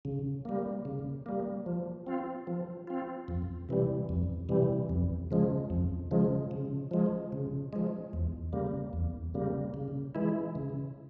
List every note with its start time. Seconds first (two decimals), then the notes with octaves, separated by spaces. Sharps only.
0.05 C#3
0.45 G3 A#3
0.85 C#3
1.26 G3 A#3
1.66 F3
2.07 C4 F4
2.47 F3
2.87 C4 F4
3.28 F2
3.69 C3 E3 G3
4.09 F2
4.49 C3 E3 G3
4.89 F2
5.31 C#3 F3 G#3
5.70 F2
6.11 C#3 F3 G#3
6.51 C#3
6.91 F3 G#3
7.32 C#3
7.73 F3 G#3
8.13 E2
8.53 C#3 G3 A#3
8.93 E2
9.34 C#3 G3 A#3
9.74 C#3
10.15 E3 G#3 E4
10.55 C#3